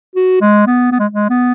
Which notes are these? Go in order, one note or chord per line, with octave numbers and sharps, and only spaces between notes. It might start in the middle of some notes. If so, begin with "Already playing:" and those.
F#4
G#3
B3
B3
G#3
G#3
B3